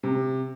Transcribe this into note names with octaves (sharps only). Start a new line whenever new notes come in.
C3